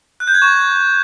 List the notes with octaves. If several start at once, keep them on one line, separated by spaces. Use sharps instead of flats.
F#6
G6
G#6
C#6